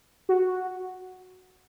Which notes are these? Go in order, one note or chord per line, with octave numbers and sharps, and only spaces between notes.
F#4